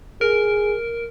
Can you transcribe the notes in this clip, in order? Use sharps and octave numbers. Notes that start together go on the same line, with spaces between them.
G#4 A#4